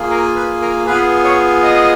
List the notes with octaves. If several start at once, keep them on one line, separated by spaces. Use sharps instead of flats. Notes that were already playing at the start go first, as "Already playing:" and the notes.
Already playing: A#3 F4 G#4
A#4
B4
A#4
B3 F4 G#4 B4
C#5
D#5